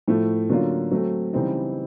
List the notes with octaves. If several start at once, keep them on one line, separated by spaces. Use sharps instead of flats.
A2 F3 A3
D3 F#3 A#3 C#4 F4
F#3 A3 C4
C#3 E3 G3 C4 D#4